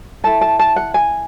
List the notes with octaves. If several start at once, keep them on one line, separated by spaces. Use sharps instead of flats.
E4 A4 A5
A5
A5
F#5
G#5